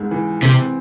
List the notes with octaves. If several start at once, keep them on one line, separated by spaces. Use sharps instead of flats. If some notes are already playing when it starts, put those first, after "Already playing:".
Already playing: C#2 G#2
E3
C3 C4